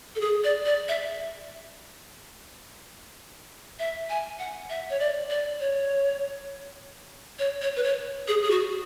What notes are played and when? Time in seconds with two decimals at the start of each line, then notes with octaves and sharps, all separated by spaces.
0.15 A4
0.20 G#4
0.44 D5
0.65 D5
0.88 E5
3.79 E5
4.09 G#5
4.39 F#5
4.70 E5
4.90 C#5
4.99 D5
5.30 D5
5.60 C#5
7.39 C#5
7.62 C#5
7.76 B4
7.83 C#5
8.28 G#4
8.42 G#4
8.50 F#4